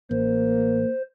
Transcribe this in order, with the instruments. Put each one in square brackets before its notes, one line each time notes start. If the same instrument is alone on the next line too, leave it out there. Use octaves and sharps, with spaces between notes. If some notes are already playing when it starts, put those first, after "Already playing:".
[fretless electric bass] A1 [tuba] A#3 [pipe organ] C5